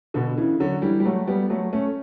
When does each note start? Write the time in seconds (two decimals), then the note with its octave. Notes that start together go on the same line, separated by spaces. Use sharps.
0.14 B2 D3
0.37 C#3 E3
0.60 D3 F#3
0.82 E3 G3
1.00 G3
1.05 F#3 A3
1.28 G3 B3
1.50 F#3 A3
1.73 A3 C#4